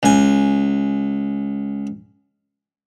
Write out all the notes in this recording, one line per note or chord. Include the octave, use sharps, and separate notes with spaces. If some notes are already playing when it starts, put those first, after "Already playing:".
C#2 G#5